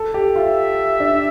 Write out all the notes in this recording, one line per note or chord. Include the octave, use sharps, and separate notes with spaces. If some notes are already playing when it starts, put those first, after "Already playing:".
Already playing: A4
G4
F4 E5
D4